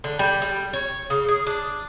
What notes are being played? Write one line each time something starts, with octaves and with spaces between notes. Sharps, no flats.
D3
G3
G3
C#5
C#3
G#4
D4